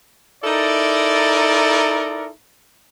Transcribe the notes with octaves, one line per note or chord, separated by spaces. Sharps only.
D#4 E4 A4 A#4 D5